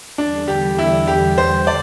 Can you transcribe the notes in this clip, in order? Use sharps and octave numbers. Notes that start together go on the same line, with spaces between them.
E2 D3 G3 D4
G4
E4
G4
C5
D5